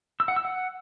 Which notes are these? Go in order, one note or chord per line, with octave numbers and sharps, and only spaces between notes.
E6
F#5
E6
F#5